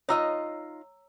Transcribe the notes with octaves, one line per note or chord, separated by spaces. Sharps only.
D#4 F4 C#5 D#5 A#5 E6